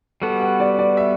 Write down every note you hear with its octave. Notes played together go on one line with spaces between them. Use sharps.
G3 B3 F#4 A4
F#5
D5
D5
E5